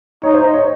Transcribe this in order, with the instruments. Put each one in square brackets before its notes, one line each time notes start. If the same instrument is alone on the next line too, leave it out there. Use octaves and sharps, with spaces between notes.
[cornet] D#4 [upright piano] C#5
[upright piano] C5
D#5
C#5